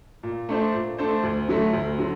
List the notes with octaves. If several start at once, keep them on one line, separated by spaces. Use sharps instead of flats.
A#2
A3 D4 A4 C5
A#2
A3 D4 A4 C5
D2
D3 F#3 A3
D2
D3 F#3